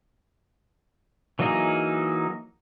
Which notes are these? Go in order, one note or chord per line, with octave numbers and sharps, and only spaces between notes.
E3 F#3 A#3 D#4 G#4